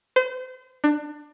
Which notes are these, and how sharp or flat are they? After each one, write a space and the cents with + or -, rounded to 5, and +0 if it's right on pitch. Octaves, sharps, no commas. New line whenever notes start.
C5 -35
D4 +25